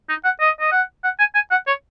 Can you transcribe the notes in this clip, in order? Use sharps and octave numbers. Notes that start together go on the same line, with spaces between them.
D#4
F#5
D#5
D#5
F#5
F#5
G#5
G#5
F#5
C#5